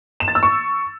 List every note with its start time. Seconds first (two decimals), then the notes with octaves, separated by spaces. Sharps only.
0.20 E7
0.28 A6
0.35 E6
0.43 C#6